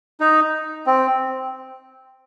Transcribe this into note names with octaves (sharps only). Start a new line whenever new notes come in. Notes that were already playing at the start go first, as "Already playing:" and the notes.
D#4
C4